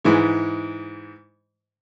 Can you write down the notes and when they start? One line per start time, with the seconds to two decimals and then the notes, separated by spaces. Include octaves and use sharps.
0.04 G#2 E3 G#3